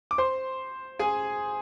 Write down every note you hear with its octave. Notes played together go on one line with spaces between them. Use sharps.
D6
C5 C6
G#4 G#5